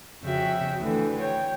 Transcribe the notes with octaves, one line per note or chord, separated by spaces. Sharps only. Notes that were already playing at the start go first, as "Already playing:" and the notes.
F2 C#3 F#4 E5 G5
D2 D3 E3
C#5 G5